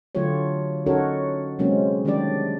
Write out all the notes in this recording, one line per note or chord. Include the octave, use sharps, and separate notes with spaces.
D3 F#3 A3 F4 G4 C#5
C#4 D#4 F#4 A4 A#4 C#5
C3 F#3 G#3 A#3 C4 C#4
D#3 G3 C#4 D4 G4 D5